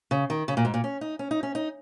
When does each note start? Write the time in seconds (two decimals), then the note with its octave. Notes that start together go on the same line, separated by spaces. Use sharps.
0.11 C#3
0.30 D#3
0.48 C#3
0.57 A#2
0.65 G#2
0.74 A#2
0.84 C#4
1.01 D#4
1.19 C#4
1.31 D#4
1.43 C#4
1.55 D#4